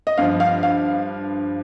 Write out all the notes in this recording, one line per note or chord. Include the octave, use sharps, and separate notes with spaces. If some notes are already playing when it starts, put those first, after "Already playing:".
D#5
G2 F3 F5
F5
F5